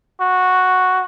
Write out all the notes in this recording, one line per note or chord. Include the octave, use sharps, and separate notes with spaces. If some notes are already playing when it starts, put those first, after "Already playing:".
F#4